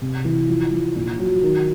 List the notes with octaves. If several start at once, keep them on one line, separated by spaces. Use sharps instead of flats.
C3
E3
F3
F3
A#1
F#3
D#3